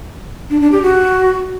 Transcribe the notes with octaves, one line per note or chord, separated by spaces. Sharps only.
D4
D4
G4
F#4